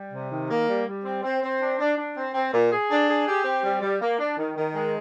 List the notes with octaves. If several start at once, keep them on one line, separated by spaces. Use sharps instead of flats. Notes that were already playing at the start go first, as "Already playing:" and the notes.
Already playing: G3
C3
D#3
A#3
G3
G3
C4
C4
C4
D4
D4
D4
C4
C4
A#2
G#4
D4
G#4
G4
C4
G3
G3
A#3
D4
D#3
D#3
G#3